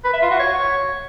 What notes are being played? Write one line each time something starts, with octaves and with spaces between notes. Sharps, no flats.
B4
E5
F4
F#4
C#5